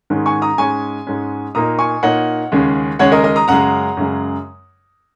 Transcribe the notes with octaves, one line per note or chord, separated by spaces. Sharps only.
G#2 D#3 G#3 C#4
G#5 C#6
A#5 D#6
G#2 G#3 C#4 G#5 C#6
G#2 G#3 C#4
A#2 A#3 D#4 A#5 D#6
G#5 C#6
A#2 A#3 D#4 C#5 F#5
D#2 C#3 G#3 C#4
D#2 C#3 G#3 C#4 C#5 F#5
A#4 D#5
A#4 D#5
A#5 D#6
F#2 C#3 G#3 F#5 A#5
F#2 C#3 G#3